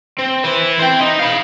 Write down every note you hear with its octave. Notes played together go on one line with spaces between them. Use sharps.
C4
E4 B4
C5 G5
D#4
F5 B5